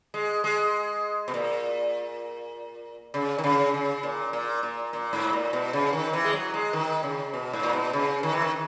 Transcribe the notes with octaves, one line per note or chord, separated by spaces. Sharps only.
G#3
G#3
B2
A#2
C#3
D#3
C#3
C#3
A#2
A#2
A#2
A#2
G#2
A#2
B2
C#3
D#3
E3
G#3
F#3
G#3
D#3
C#3
B2
G#2
A#2
B2
C#3
D#3
E3
D#3